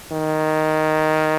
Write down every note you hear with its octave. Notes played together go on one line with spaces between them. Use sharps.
D#3